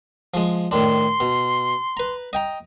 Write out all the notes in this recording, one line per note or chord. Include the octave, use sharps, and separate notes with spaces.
F3 G#3
A2 D#3 D4 C6
B2
B4 A#5
D#5 G5 A#5